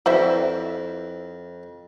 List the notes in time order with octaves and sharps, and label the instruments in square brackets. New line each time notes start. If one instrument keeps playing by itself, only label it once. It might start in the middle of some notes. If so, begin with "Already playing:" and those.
[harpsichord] F2 [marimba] E4 B4 D5 [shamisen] F#4 C5 E5